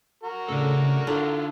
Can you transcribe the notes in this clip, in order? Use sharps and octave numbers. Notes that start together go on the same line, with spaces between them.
F#4 A#4
A2 C#3 A3 A4 D5
D3 E4 F4 A4